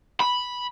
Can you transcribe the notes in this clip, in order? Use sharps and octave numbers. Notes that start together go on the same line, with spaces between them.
B5